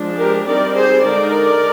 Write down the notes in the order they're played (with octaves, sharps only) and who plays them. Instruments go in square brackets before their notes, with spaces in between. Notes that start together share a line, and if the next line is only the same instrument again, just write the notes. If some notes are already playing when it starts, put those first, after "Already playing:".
Already playing: [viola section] F3 G#3 D4
G4 A#4
G3 C4 D#4 A#4 D5
G#4 C5
D3 G#3 D#4 A#4 D5